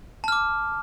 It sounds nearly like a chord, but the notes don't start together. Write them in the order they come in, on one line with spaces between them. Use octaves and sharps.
A5 F6 D6